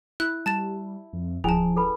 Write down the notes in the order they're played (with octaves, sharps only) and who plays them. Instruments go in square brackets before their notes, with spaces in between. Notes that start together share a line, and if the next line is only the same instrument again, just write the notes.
[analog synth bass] E4 [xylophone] F#6
[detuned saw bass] G3 [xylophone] A5 A6 E7
[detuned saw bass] F2
[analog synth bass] D1 [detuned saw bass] F3 [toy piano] C#4 E4 G#5 [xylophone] G#4 A5
[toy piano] A4 B4 B5